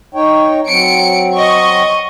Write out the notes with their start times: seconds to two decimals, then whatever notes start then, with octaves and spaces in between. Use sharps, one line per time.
0.15 D#4 C#5 G5
0.68 F#3 C4 C#7 D7
1.35 D#5 C#6